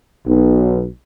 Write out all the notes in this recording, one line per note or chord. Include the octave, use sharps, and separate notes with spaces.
B1